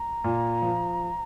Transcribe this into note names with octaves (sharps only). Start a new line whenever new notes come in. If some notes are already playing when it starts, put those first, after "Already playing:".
Already playing: A#5
A#2
F3